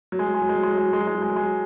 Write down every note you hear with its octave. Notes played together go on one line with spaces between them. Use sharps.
F#3
G#3
F#3
G#3
F#3
G#3
F#3
G#3
F#3
G#3
F#3
G#3
F#3
G#3
F#3
G#3
F#3
G#3
F#3